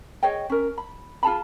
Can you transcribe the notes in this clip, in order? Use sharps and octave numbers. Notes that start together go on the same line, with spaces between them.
G#4 C#5 D#5 G5
C#4 A#4
B5
F4 G#4 A5 B5